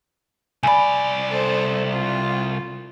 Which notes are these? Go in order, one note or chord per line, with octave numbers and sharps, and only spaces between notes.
C2 D5 G#5 B5
A4 C5
F4